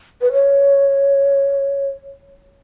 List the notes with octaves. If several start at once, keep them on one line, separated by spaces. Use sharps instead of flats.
B4
C#5